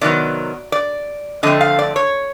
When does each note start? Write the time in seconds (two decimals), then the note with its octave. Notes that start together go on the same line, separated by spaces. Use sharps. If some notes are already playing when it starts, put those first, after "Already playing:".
0.01 C3 D#3 F#3 B3 D5
0.72 D5
1.43 D3 F3 A3 C4 D#5
1.61 F5
1.79 D5
1.96 C#5